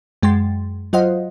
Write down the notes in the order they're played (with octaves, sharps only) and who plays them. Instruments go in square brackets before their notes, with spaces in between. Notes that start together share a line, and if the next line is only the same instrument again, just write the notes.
[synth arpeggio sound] F#2 G#3 G5 C6 A6
F#3 F4 C5 D#5 F5 F#5